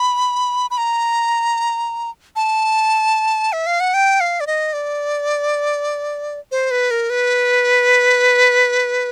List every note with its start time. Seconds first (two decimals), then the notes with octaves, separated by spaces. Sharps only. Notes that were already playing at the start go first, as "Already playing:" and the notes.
Already playing: B5
0.71 B5
0.78 A#5
2.36 A5
3.53 E5
3.67 F5
3.80 F#5
3.94 G5
4.20 F5
4.40 D5
4.47 D#5
4.73 D5
6.51 C5
6.71 B4
6.91 A#4
7.10 B4